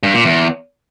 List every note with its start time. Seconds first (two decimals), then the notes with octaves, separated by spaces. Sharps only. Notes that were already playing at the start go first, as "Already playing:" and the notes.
0.03 G2
0.14 A#2
0.25 E2